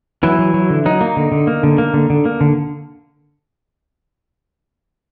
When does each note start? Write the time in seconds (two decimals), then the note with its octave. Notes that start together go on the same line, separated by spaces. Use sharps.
0.23 E3 F#3 E4
0.39 F#3
0.54 F#3
0.70 D3
0.85 F#3 D#4
1.01 A#3
1.17 D3
1.32 D3
1.47 A#3
1.63 D3
1.78 A#3
1.94 D3
2.10 D3
2.25 A#3
2.41 D3